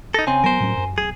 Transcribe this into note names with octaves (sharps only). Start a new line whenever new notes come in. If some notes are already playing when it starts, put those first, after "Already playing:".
D#4 A4 A#6
C#3 C4 G#5
F#3 B3 A#4 C5
A2 F#3 C#4
F#2
B1 G#4